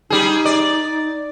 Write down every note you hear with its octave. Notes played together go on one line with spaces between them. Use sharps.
G3 D#4 G#4
D5